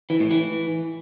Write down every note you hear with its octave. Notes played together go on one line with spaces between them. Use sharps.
E3
A2
E3